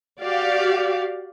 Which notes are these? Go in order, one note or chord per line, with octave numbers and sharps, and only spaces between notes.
F#4 G4 D5 F5